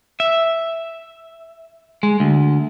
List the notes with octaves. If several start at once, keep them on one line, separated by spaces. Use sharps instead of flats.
E5
G#3
D2